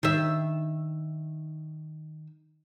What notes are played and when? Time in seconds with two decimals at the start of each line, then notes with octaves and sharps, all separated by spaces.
0.03 D#3 E5